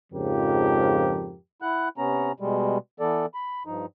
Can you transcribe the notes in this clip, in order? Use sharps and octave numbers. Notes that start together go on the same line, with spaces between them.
F2 G#2 C#3 F3 G4 A#4
E4 F#5 F#6
C3 B3 C#4 A#5
B2 G3 G#3
E3 B3 A4 D5
B5
G2 F3 D#4